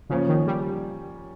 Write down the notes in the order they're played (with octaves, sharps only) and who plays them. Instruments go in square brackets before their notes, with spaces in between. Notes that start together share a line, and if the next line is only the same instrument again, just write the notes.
[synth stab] C#3 [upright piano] F3 A#3 C#4
[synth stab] D#3
G3